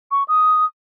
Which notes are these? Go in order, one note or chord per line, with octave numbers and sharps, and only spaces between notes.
C#6
D#6